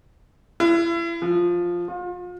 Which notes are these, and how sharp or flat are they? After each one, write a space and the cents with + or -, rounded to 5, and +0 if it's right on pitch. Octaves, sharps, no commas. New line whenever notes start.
E4 +35
F3 +5
F4 +35